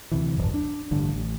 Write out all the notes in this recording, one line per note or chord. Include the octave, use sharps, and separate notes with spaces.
D2 C3 E3
D#1 G#1 F#2
D4
A1 G2 D3
A1